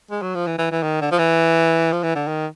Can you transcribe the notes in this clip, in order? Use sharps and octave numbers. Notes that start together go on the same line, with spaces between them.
G#3
F#3
F3
E3
E3
E3
D#3
D3
F3
E3
F3
E3
D3
D#3